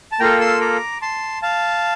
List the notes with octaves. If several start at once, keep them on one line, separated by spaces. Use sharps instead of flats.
A5
A#3 F4 A4 G5 A#5
C6 E6
A#5 D6
A5 C6
F5 A5